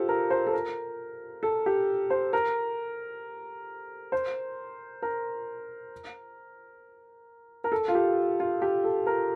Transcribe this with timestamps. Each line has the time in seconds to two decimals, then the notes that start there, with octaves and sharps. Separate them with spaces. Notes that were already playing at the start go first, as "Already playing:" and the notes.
Already playing: F4 G4 A4 C5
0.09 A#4
0.30 C5
0.47 A4
0.53 A#4
1.43 A4
1.66 G4
2.10 C5
2.33 A#4
4.12 C5
5.02 A#4
7.64 A#4
7.72 A4
7.88 F4
7.95 G4
8.40 F4
8.62 G4
8.84 A4
9.07 A#4